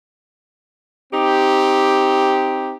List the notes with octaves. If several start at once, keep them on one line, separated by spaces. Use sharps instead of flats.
C4 D#4 G4